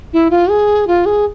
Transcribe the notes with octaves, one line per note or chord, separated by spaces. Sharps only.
E4
F4
G#4
F4
G#4